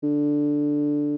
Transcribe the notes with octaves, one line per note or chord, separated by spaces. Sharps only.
D3